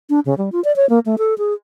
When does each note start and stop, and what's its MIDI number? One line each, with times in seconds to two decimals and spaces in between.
0.10 0.20 62
0.25 0.34 49
0.38 0.50 55
0.52 0.63 65
0.64 0.75 74
0.76 0.88 73
0.89 0.99 58
1.06 1.15 57
1.18 1.34 69
1.38 1.54 68